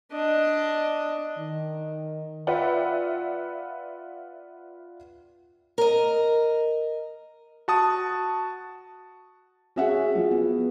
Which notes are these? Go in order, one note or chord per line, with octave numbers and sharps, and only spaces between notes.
D4 D#5
D#3
F4 B4 D5 E5 F#5 G5
A#4 D#5
F#4 A5 D#6
C#4 F#4 G#4 E5 F#5
F3
B3